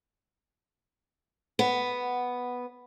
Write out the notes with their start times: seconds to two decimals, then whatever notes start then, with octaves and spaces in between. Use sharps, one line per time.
1.59 B3